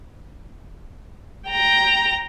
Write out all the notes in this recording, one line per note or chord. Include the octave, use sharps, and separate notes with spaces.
G5 A#5